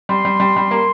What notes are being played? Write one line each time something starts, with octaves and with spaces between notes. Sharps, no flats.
G3 C6
G3
G3
G3
A#3